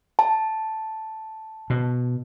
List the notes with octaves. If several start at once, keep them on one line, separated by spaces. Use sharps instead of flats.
A5
B2